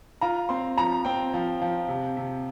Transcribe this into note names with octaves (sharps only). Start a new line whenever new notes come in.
F4 A#5
C4 C6
F3 A#5
C4 G5
F3
F3
C3
C3